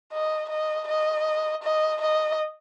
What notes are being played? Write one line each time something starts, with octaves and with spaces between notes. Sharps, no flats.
D#5
D#5
D#5
D#5
D#5